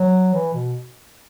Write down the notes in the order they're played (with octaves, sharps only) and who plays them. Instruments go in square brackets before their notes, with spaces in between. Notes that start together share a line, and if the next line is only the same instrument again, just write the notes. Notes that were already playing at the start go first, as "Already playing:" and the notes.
Already playing: [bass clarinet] F#3
E3
B2